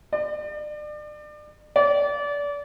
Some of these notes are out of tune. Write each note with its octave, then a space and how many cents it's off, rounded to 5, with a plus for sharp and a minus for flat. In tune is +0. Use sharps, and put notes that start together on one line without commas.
D5 +35
D5 -30